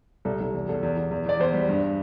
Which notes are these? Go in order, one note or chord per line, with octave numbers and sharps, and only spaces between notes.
C2 A4
C2
E2
E2 A4
E2
E2
E2
E2 D5
E2 C5
G3
G2